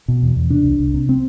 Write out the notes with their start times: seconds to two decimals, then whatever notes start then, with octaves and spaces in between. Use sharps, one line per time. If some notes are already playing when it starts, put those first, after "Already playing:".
0.08 B2
0.22 E2
0.36 E2
0.50 C3 D4
0.65 C2
0.80 C2
0.94 C3
1.09 C4